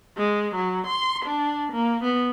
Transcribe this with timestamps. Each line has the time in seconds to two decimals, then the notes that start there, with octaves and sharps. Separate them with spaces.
0.17 G#3
0.56 F#3
0.88 C6
1.25 D4
1.71 A#3
2.02 B3